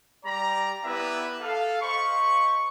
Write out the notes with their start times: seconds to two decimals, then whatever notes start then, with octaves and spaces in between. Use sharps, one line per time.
0.25 G3 G4 D5 A#5
0.84 B3 E4 G4 B4 D5 E5
1.41 A4 F5
1.82 C5 D#5 B5 C#6